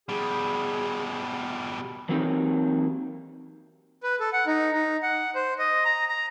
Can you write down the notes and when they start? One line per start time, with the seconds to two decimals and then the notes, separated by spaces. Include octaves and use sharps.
0.09 B2 G3 G#4
2.09 E3 F#3 A#3 C4 D#4 G4
4.03 B4
4.20 A4
4.33 F#5
4.47 D#4
4.72 D#4
5.03 F#5
5.35 C5
5.59 D#5
5.85 A#5
6.09 A#5